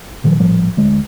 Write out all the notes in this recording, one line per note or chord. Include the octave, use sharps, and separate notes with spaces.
A#2 D#3 F3 F#3
A#1 A2 F3 G3
D2 G#3